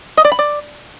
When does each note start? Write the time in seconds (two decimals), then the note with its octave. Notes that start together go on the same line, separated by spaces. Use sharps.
0.17 D#5
0.25 D5
0.32 B5
0.39 D5